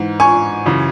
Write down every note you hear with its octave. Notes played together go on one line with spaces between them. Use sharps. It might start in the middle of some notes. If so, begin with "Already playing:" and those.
Already playing: G#2 E3
G#5 C#6
F#2 C#3 E3